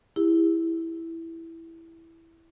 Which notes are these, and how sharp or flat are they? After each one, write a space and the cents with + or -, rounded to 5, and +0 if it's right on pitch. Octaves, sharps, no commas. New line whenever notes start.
E4 +0 G4 +40